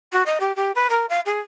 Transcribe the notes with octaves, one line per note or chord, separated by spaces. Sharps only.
F#4
D#5
G4
G4
B4
A#4
F5
G#4